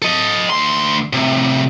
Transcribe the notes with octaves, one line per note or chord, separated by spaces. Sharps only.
A4 D#5
D2 C6
A2 C3